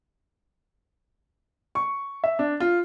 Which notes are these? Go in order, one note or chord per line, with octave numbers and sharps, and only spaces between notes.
C#6
E5
D4
F4